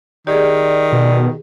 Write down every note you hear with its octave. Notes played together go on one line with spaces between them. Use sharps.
D#3 G4 G#4 D5
B2